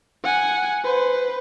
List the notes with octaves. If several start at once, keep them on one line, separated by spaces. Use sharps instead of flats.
F#5 G#5
B4 C5